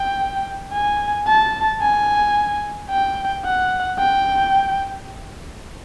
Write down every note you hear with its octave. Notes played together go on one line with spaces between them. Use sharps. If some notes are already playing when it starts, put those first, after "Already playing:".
Already playing: G5
G#5
A5
G#5
G5
F#5
G5